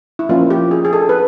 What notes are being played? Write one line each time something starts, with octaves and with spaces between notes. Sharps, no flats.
E4
F3 A#3 C#4 F4
G4
G#4
G#4
A4
B4